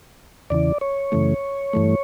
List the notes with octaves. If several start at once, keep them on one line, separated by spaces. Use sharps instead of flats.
E2 C#3 E3 D5
C#5
F#2 C#3 E3 A3
G2 E3 A3